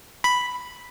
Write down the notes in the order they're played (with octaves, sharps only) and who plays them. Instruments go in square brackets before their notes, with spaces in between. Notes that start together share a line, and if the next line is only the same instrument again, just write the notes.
[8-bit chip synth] B5